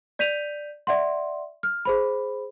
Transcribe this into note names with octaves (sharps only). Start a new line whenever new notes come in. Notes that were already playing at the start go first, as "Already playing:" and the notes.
D5 G6 B6 D#7 F7
D5 E5 F#5 C6
F6
G#4 C5 B5